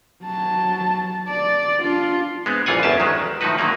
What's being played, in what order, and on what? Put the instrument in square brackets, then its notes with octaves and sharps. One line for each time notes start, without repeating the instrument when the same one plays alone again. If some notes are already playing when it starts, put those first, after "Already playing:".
[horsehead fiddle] F#3 A5
D5
D4 F4
[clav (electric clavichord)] G#3 B3 C4
A#1 F#2 E3 F4 F#5 G#5
G1 E2 C#4 G4 A5
D#3 F#3 G#3
A2 D#3 F3 D#4 F#4 B4
D3 D#3 F#3 A#3